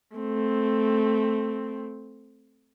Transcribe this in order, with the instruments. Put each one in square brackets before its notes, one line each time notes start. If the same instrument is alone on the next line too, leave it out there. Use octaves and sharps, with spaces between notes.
[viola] A3 C4